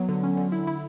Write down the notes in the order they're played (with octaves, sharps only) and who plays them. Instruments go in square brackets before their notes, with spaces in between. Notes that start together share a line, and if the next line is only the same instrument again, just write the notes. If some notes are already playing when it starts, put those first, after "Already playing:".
Already playing: [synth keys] F#3 B3
D3
C#4
D3
E4
E4